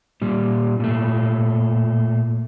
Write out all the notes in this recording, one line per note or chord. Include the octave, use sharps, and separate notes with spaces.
A#2 G3
A#2 A3